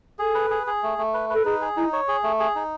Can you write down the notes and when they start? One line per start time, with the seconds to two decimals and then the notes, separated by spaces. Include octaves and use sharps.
0.19 G#4 A4
0.35 B4
0.50 G#4
0.67 G#4
0.83 A3
0.98 A3
1.14 B4
1.30 A4 B4
1.45 D#4 G#4
1.61 G#4
1.77 D#4 E4
1.93 C#5
2.08 G#4
2.23 A3
2.40 G#4
2.55 D#4